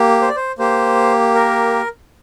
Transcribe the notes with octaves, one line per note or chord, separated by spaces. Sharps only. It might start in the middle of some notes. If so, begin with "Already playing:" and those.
Already playing: A#3 G4
C5
D5
C5
A#3 G4 C5
A#4